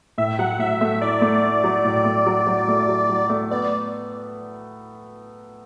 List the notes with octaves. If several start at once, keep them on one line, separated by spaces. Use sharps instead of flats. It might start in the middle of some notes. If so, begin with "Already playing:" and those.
A2 E5
F#3 F#5
A2 E5
A3 E5
E4 D5
A3
E4
F#3
A2
A3
F#3
F#3
A3
F#3
F#3
A3
B3 D5